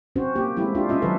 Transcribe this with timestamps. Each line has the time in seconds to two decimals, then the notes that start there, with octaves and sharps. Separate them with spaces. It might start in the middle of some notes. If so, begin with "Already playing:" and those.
0.16 C4 C#4 F#4 C5
0.36 A#3 G4
0.57 G#3 A3 C4 E4 G4
0.75 D4 F4 G4
0.89 C#4 F4 D#5 E5
1.02 D#3 F#3 A4 B4 E5